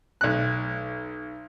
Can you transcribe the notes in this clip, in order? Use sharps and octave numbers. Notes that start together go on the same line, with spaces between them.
B1 F#6